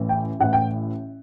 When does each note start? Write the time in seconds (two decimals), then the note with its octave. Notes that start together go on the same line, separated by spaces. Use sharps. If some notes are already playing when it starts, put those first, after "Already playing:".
Already playing: A1 A2 E3
0.09 G5
0.40 A1 A2 E3 F#5
0.53 G5